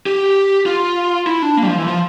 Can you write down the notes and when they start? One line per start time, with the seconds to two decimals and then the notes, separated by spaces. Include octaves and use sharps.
0.06 G4
0.66 F4
1.27 E4
1.42 D4
1.57 A#3
1.63 G3
1.67 F3
1.77 E3
1.87 F3